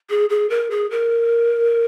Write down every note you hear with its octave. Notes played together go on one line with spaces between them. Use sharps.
G#4
G#4
A#4
G#4
A#4